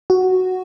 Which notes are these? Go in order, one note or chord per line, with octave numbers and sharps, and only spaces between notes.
F#4